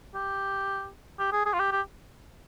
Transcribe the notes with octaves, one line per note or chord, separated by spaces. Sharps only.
G4
G4
G#4
G#4
F4
G4
G4